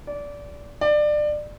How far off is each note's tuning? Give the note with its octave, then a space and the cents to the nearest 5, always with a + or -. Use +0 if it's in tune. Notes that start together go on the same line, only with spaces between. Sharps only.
D5 -20
D5 +25